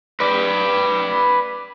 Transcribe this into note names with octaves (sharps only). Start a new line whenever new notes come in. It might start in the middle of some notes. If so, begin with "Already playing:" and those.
B4 D5